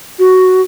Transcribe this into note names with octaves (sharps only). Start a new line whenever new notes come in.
F#4